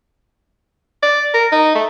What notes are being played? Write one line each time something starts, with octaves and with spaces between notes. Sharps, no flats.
D5
A#4
D#4
A3